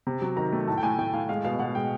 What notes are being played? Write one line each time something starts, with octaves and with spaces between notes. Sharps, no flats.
C3
F#3
D#3 A#5
A3
A2 A5
G5
A2 G#5
A2 G5
A2 F5
G#3 F5
B2 F5
B2 F#5
G#3 G5